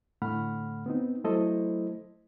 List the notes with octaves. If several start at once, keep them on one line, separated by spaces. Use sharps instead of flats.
A2 D3 A3 F#5 B5 F6
B3 C4 D#4
F#3 A3 E4 A4 C5 D#5